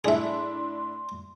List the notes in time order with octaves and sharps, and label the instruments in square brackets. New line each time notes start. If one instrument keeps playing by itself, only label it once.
[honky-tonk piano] A2 D4 E4 [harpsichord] G#4 E5 [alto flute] C6